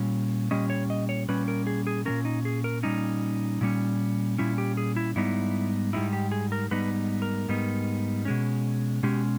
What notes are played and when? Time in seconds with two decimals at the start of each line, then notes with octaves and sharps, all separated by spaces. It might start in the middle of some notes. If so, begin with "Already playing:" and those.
Already playing: A#2 G3 C#4
0.51 A#2 G3 C#4 D#5
0.70 C#5
0.90 D#5
1.09 C#5
1.28 A#2 G3 C#4 B4
1.48 A#4
1.67 G#4
1.87 G#4
2.05 A#2 G3 C#4 A#4
2.25 D#4
2.45 G#4
2.64 A#4
2.83 A#2 G3 C#4 D#4
3.61 A#2 G3 C#4
4.38 A#2 G3 C#4 E4
4.58 G4
4.77 G#4
4.96 E4
5.16 G#2 G3 B3 D#4 E4
5.93 G#2 G3 B3 D#4 E4
6.13 G4
6.32 G#4
6.52 A#4
6.71 G#2 G3 B3 D#4 B4
7.22 A#4
7.48 G#2 G3 B3 D#4
8.25 B2 G#3 C#4
9.03 B2 G#3 C#4 G4